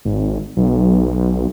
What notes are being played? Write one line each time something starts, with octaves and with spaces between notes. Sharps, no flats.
G#1
B1